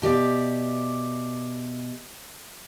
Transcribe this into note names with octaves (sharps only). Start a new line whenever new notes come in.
B2 G4 D5 E5